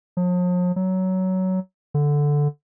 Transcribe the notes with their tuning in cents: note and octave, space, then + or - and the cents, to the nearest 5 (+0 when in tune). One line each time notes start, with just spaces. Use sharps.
F3 +45
F#3 +15
D3 -5